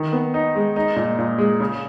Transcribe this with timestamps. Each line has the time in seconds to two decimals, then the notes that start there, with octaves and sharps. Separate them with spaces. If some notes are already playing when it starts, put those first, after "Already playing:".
Already playing: D#3
0.12 B3
0.34 D#4
0.55 G#3
0.76 D#4
0.96 A#2
1.19 A#2
1.38 G#3
1.60 C#3